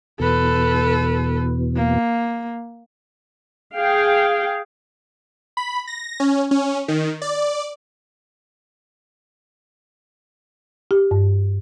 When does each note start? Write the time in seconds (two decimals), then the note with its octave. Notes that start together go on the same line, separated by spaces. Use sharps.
0.20 E2 B2 A4 B4
1.76 A#3
3.75 G#4 F5 G5
5.57 B5
5.87 A#6
6.20 C#4
6.51 C#4
6.88 D#3
7.22 D5
10.91 G4
11.11 G2